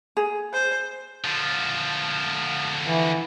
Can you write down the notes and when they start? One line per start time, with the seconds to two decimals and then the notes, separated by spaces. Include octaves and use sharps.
0.17 G#4
0.53 C5
1.25 D3 F3
2.84 E3